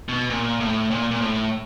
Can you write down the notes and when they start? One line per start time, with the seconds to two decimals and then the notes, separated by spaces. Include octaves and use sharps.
0.09 B2
0.30 A#2
0.60 A2
0.91 A#2
1.11 A#2
1.21 A2